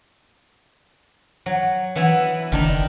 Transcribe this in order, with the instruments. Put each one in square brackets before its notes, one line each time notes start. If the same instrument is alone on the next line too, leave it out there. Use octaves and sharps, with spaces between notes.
[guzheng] F#3
E3 B3 E4
[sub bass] F#1 [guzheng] D#3 D4 D#4